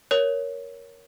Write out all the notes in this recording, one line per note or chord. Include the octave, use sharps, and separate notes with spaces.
A#4 C#5